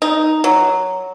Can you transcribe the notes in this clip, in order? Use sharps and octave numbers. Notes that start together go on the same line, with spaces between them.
D#4
F#3